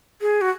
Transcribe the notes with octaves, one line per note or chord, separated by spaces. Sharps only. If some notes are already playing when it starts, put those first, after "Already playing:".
G#4
F#4